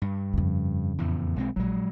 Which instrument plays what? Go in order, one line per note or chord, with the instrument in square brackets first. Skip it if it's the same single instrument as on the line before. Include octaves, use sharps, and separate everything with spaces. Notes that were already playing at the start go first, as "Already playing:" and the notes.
[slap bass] G2
[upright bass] F2 C#3
[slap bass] E2 A2
B1 G#3 C4
[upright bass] A#1 [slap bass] F#3 G#3